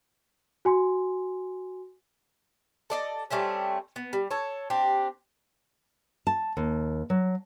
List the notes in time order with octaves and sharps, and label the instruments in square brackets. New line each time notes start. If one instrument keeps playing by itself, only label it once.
[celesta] F#4 G#5 C6
[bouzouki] A4 D5 D#5
G3 A3 C4 C#4
B3
G3
A4 C#5
C4 D4 G4
[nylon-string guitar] A5
D#2
F#3